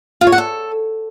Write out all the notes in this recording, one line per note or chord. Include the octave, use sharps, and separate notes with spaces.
F4
C#5
F#5
A4